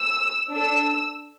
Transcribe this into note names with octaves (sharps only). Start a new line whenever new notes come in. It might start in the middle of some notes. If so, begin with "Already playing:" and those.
Already playing: E6
D4 A4 E6